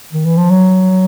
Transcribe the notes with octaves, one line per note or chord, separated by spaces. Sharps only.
D#3
E3
F3
F#3